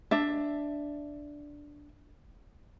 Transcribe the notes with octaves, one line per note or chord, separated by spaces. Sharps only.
D4 E5